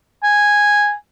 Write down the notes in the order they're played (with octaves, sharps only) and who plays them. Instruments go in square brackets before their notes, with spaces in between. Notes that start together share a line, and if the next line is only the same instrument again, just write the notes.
[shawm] G#5